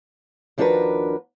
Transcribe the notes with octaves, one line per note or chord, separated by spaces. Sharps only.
D#2 F3 D4 F#4 A#4 B4